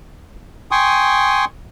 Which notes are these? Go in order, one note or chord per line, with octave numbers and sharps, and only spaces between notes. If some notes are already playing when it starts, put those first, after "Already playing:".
G5 G#5 C6 C#6 D#6